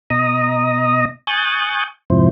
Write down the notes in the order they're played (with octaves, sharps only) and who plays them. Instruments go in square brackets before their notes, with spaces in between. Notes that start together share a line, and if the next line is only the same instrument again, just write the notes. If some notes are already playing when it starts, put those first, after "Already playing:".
[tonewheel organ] B2 D#5 A#5 D#6
G#5 C#6 D#6 F#6 G6 A6
F2 G#2 C3 F3 E4 C5